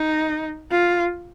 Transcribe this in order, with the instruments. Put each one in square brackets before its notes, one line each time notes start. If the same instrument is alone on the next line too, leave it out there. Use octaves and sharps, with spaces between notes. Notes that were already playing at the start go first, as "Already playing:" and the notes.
Already playing: [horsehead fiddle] D#4
F4